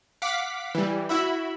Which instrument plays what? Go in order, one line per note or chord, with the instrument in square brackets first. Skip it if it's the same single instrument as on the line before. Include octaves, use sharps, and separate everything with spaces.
[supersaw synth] F5 F#5 D6 B6
E3 G3
E4 F#4 E5 B5